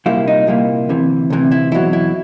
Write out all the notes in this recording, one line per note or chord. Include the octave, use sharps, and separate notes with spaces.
C2 A#2 G3 A#3 E4
D#4
C2 A#2 G3 A#3 E4
D2 C3 E3
D2 C3 E3
E4
E2 B2 F#3 E4
E4